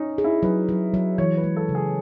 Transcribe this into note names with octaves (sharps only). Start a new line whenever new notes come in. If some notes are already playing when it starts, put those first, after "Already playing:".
Already playing: C#4 D#4
G#4
E4
F#3 B4
F#3
F#3
E3 C#5
B4
G#3
A4
C#3
G#4